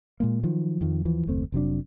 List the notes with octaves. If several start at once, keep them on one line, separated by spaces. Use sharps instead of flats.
A#2 G#3 A#3
D#3 F3 F#3
F2 D#3 F3
D#2 E3 F3
F#1 D#2 A3 C4
F1 C3 F#3 D4